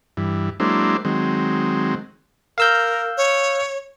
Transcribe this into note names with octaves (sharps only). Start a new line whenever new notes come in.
G2 E3
F#3 G#3 A#3 D4 E4 C5
D#3 F#3 G#3 C4
A#4 F5 E6 G6
C#5